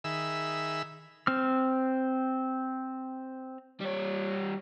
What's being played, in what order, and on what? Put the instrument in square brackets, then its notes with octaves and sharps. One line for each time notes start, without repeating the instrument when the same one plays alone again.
[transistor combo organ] D#3 G#4 E5 B5 E6
[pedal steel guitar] C4 F6
[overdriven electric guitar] G3 C#5